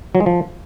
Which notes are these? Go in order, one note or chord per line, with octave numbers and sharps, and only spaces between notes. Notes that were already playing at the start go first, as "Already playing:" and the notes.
F#3
G#3
F3